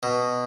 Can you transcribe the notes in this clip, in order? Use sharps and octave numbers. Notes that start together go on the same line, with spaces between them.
B2